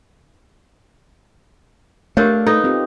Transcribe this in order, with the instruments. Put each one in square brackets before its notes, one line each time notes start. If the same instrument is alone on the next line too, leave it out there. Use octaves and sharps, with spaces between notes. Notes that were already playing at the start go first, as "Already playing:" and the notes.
[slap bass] A3 [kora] D4 [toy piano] G4 A#4 C#5 [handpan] F5
[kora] D#4 [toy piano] A4 [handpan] B4
[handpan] C4 F4 G4